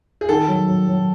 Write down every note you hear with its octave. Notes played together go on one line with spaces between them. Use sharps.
G#4
D#3 A4
F#3
F#3
F#3